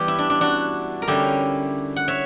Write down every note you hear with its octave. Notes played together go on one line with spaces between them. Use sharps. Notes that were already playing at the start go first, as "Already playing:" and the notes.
Already playing: E3 G3 B3 G4
E4
D4
D4
D4 F#4
A#4
D3 G3 C#4 E4 G4
F#5
C#5 E5